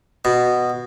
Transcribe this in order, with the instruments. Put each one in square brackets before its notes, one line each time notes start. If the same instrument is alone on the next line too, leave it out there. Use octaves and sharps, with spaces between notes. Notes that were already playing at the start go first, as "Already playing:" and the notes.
[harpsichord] B2